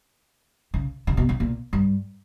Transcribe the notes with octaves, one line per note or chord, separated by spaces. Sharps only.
C#3
C#3
B2
C#3
A#2
G2